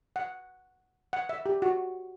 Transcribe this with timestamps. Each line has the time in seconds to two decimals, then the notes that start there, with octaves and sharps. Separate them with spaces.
0.16 F#5
1.13 F#5
1.29 E5
1.46 G4
1.62 F#4